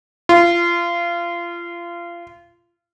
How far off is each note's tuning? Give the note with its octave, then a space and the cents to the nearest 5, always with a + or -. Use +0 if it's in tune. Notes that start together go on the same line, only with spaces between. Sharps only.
F4 -25